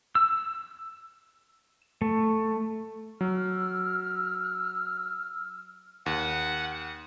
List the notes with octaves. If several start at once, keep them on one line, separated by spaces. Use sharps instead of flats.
E6
A3
F#3 E6 F6
D#2 F#5